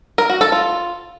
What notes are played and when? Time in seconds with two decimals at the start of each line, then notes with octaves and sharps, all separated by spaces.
0.18 A#4
0.30 F#4
0.41 A4
0.52 F4